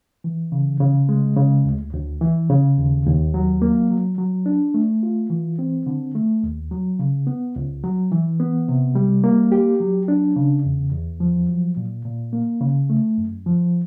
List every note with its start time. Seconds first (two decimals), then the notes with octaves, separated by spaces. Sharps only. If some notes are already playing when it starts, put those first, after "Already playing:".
0.24 E3
0.52 C#3
0.80 C#3
1.09 G#3
1.37 C#3
1.65 D2
1.93 D2
2.21 E3
2.49 C#3
2.78 D#2
3.06 D#2
3.34 F#3
3.62 A#3
3.90 F#3
4.18 F#3
4.46 D4
4.74 A3
5.03 F4
5.30 E3
5.59 C4
5.87 D3
6.15 A3
6.44 D#2
6.71 F#3
6.99 C#3
7.27 B3
7.56 C#2
7.84 F#3
8.12 E3
8.40 B3
8.68 C3
8.95 G3
9.24 A#3
9.52 G4
9.80 F#3
10.08 D4
10.36 C#3
10.65 E2
10.93 E2
11.20 F3
11.49 F#3
11.77 A#2
12.05 A#2
12.33 A#3
12.61 C#3
12.90 A3
13.18 F#2
13.46 F3